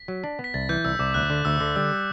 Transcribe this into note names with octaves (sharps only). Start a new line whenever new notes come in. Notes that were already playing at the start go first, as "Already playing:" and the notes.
Already playing: B6
F#3
D4
B3
B6
C2 A6
E3 G6
C2 E6
C2 D6
D2 F#6
D3
D2 E6
D3
G3 E6